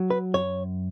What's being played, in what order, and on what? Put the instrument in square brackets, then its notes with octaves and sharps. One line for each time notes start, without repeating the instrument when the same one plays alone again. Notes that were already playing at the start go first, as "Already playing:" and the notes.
Already playing: [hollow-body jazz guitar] F#3
B4
F#2 C#5